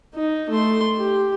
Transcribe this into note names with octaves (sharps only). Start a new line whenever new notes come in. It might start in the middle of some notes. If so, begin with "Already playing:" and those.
D#4
A3 C6
G4